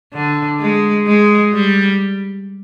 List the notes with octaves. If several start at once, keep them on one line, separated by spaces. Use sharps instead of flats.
D3
G#3
G#3
G3